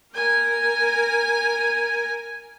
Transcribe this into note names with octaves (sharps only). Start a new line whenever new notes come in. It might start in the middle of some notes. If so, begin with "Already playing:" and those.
A#4 G#5